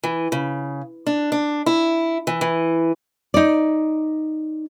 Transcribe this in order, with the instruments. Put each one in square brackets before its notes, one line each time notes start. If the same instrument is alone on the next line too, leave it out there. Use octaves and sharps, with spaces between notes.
[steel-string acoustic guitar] E3
C#3
D4
D4
E4
E3
E3
[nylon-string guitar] D#4 D5